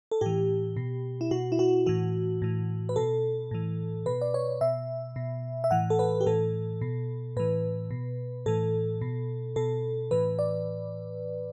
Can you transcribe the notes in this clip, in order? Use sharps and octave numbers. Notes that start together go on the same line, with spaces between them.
A4
A2 E3 G4
B2
E4
B2 F#4
E4
F#4
A2 E3 F#4
A2 E3
B4
B2 A4
A2 E3
B2 B4
D5
C#5
B2 E5
B2
E5
A2 E3 F#5
A4
B4
G4
A2 E3 A4
B2
A2 E3 B4
B2
A2 E3 A4
B2
B2 A4
A2 E3 B4
D5